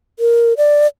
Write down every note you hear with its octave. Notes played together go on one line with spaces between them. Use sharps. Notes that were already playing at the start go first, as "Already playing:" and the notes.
A#4
D5